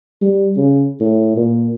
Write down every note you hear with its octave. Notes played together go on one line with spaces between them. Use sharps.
G3
C#3
A2
A#2